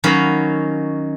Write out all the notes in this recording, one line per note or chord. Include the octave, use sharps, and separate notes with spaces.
D#3 F#3 C#4 F5 B5